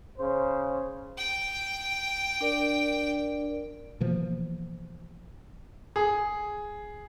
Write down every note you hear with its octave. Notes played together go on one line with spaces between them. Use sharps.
C#3 C5
G5
D4 A#4 D5
B2 E3 F3 A#3
G#4